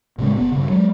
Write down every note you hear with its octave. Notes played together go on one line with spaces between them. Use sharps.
A2 C#3 G#3
F#1 C#3 B3
G2 C#3
F#3 G#3